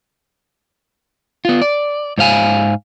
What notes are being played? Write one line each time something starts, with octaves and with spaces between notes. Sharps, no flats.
B3 F4
D5
G#2 C5 F5 G#5